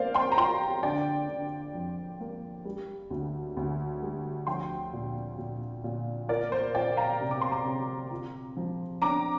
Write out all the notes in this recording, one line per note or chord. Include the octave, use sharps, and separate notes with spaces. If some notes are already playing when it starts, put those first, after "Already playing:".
Already playing: A#3 A#4 C5 D5 F5
G5 C6
A#5
F4 G5 C6
D3 D5 G5
D3
F2
A#3
G3
D2
D2
G3
F3 G5 C6
A#2
A#2
A#2
F4 A#4 D5
C5
F4 D5 G5
F5 A#5
C3
D6
C6
A#5 D6
C3
F4
F3
D4 A#5 D6